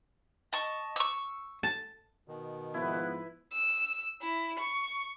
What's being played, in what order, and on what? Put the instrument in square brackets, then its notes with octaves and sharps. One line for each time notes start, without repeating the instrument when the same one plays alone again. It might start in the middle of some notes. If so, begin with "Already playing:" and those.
[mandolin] D#5 A5 C#6
C#6 E6
[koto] A5
[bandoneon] B2 D#3
[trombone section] G#2 F3 [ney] B3 [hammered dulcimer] E4 B4
[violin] E6
E4
C#6